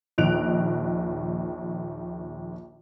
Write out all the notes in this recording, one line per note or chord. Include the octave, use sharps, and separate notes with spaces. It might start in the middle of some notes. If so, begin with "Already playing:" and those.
A#1 D#2 D#5 F#6 D7 F7